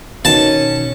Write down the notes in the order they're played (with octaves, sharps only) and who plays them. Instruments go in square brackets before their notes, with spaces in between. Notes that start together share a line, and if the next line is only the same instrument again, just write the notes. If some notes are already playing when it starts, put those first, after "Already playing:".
[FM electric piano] B2 D#3 [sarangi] C#4 [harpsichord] A5